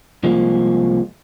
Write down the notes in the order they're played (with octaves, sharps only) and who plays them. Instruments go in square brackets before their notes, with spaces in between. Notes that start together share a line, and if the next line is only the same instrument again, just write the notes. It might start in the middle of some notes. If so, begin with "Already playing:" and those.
[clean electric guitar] C2 F3 G#3 A#3